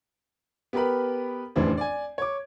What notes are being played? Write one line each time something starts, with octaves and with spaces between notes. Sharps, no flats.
B3 G4 A#4 B4 B5
F1 A2 E3 C#4 D4 C5
D5 G#5
C#5 D6